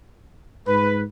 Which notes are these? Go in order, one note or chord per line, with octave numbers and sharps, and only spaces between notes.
G#2 B4